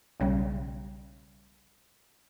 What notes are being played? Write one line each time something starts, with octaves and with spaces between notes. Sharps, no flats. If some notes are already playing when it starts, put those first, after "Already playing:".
B1 C#3 G3